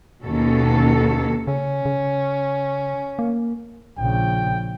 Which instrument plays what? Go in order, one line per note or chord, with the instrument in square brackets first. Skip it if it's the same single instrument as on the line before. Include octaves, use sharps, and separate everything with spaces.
[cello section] D#2 B2 D#3 C#4 A4
[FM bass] C#3 [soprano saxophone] C#4
[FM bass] C#3
A#3
[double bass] A#1 C#3 [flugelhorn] G5